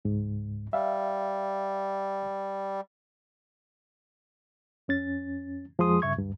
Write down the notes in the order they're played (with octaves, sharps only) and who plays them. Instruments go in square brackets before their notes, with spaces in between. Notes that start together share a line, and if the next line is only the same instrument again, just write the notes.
[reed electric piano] C#2 G#2
[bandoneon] G3 [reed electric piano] E5 F5
[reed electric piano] F2 C#4 A6
F2 F3 G#3 G#4 C6 D#6
G2 C#3 E5 C#6 G#6
D2 G2